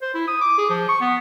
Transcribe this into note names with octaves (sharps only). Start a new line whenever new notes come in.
C5
E4
D#6
D6
G#4
F3
C#6
B3